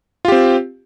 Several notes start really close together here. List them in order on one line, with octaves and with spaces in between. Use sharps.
F4 G4 C4